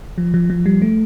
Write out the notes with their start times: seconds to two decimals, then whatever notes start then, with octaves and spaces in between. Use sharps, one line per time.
0.18 F3
0.34 F3
0.50 F3
0.66 G3
0.82 A3